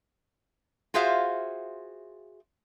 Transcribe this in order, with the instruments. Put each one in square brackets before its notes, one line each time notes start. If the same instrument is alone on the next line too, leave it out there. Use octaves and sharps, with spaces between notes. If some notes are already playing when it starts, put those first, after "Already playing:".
[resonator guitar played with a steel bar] F4 F#4 G#4 C5 E5 F5